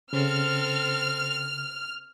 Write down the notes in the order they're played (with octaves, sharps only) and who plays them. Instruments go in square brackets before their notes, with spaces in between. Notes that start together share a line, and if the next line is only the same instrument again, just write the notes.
[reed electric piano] C#3 [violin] C4 A4 [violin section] F6